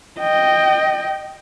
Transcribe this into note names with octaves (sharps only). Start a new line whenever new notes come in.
D#5 G5